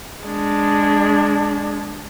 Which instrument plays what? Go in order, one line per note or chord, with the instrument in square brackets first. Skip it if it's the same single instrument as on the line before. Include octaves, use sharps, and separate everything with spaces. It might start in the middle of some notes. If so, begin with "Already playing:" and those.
[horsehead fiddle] G#3 D4